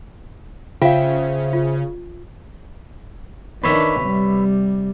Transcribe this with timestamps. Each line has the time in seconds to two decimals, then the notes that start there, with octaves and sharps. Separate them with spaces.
0.82 C#3 F4 C5 E5 F5 G5
1.53 F4
3.64 D#3 D4 B4 C#5 E5
4.01 C3 G3